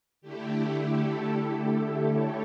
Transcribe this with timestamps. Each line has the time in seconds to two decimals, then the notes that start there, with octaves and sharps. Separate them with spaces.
0.21 D3 A3 E4 G4
0.84 A4
2.11 C#5